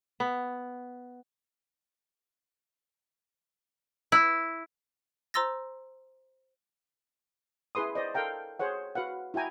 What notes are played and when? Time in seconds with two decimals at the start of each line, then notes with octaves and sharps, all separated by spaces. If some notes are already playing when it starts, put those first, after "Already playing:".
0.20 B3
4.12 E4
5.34 C5 A#5 C6 E6 A6 A#6
7.75 E4 G#4 B4 C6 D#6
7.95 C5 D5 D#5
8.14 A4 A#4 F5 G5 A#5
8.59 G#4 C5 C#5 F#5
8.95 F#4 B4 F5 F#5
9.34 E4 F#4 G5 G#5 A#5